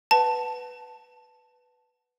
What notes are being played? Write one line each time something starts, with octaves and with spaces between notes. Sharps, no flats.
B4 F#5 A5